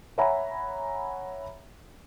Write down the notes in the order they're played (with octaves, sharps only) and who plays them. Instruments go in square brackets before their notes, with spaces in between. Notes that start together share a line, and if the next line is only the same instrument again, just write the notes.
[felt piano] C#5 E5 F#5 G#5 A#5 B5